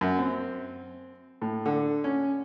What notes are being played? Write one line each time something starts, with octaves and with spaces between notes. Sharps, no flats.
F#2
C4
A2
D3
C#4